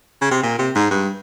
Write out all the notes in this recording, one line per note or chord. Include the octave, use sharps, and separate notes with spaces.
C#3
C3
A#2
C3
G#2
G2